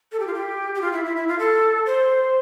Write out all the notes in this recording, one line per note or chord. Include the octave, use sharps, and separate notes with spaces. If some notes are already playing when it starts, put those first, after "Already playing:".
A4
G4
F4
G4
G4
F4
E4
E4
E4
F4
A4
C5